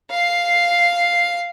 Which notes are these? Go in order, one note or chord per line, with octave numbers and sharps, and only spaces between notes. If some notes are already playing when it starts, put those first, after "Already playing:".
F5 C7